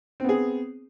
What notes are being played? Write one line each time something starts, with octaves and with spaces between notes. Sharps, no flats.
B3 C4 G#4